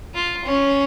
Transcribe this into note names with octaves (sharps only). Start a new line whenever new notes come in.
F4
C#4